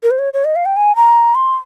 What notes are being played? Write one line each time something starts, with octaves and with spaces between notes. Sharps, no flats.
A#4
C5
C#5
C#5
D#5
F5
G5
G#5
A#5
C6